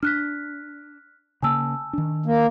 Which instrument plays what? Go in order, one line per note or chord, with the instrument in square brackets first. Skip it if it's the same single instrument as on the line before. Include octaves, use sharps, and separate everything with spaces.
[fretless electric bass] D4 [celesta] F6 F#6 B6
[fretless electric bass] C#3 A#3 [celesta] G#5 A5 E6
[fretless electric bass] D#3 D4
[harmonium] A#3